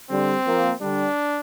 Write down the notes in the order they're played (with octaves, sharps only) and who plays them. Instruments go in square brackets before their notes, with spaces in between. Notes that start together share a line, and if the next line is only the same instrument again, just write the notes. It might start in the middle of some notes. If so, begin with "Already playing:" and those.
[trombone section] D3 G3 [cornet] C4
[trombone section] F3 A#3
[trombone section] D3 G3 [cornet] D4